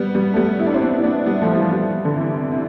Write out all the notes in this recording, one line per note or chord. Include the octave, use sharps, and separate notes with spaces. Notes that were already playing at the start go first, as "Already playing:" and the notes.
Already playing: G3 B3
G3 B3
A3
G3 B3
E4
D4
C4 E4
B3 D4
E4
B3 D4
G3 B3
F3 A3
E3 G3
G3 B3
D3
C3 E3
C3